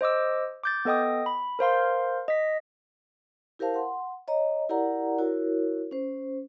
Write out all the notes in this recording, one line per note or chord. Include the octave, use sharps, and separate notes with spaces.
C5 D#5 D6 E6
D6 G6 A6
B3 A4 D#5 G5 D#6
B5
A#4 C5 F5 C6
D#5 B6
E4 G4 A#4 C5 F5 A5
F#5 C6
C#5 D#5 A#5
E4 G4 A#4 D5 F#5 A#5
E4 F#4 A#4 C#5
C#4 C5